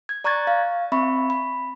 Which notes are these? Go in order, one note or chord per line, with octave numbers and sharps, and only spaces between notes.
G#6
D5 A#5 C#6 F#6 G#6 A6
F5
C4 E5 B5 C#6
B5